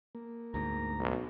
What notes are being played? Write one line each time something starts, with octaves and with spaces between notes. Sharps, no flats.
A#3
D2 G#2 A#5
B1